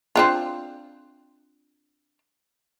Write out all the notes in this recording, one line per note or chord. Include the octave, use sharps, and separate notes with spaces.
C4 D4 F4